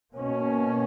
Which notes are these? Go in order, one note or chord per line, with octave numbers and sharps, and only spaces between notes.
B2 A#3 C#4